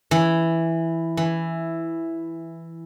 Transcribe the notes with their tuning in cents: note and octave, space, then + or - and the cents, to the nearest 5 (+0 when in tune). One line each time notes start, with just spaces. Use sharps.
E3 +0
E3 +5